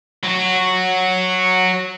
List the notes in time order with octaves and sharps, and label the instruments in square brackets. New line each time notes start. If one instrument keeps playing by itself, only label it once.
[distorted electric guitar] F#3 F#4